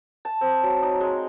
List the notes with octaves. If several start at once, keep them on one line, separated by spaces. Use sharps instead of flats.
A5
C4
F#3
D#4
G#3